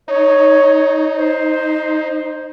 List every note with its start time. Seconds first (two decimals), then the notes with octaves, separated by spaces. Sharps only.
0.08 D#4 C#5
1.16 C5